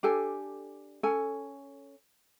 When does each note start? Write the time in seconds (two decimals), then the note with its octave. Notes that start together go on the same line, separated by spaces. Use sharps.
0.03 D4 G4 A4 G#5
1.03 C#4 A4 G#5